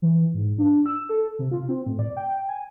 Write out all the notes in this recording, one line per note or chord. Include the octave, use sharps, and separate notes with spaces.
E3
G#2
D4
E6
A4
C3
F4
C4
A2
D5
G5
G#5